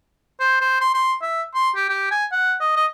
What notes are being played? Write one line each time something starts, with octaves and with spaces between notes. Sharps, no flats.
C5
C5
C6
C6
E5
C6
G4
G4
G#5
F#5
D#5
D#5